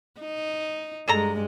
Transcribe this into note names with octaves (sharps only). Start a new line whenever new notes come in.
D#4
G2 G#3 G#4 A4 A#5